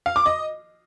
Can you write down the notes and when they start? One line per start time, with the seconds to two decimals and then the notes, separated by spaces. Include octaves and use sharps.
0.06 F5
0.16 D6
0.26 D#5